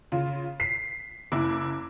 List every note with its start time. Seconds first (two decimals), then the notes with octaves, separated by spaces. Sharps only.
0.12 C#3 F4
0.60 B6 C7
1.32 F#1 E4 D6